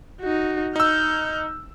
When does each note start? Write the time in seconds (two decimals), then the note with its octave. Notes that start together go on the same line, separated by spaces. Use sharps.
0.21 D#4 F#4
0.76 D#4 E6 F6 G6